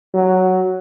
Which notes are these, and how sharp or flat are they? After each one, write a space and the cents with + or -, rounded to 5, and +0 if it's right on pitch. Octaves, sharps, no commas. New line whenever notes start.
F#3 +5